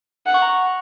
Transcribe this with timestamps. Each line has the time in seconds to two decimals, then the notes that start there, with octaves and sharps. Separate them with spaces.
0.26 F#5
0.34 C#6
0.42 A#5
0.49 C#6